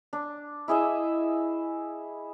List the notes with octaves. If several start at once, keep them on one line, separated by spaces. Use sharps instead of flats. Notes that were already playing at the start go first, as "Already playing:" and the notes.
D4
E4 G#4 D#5 E5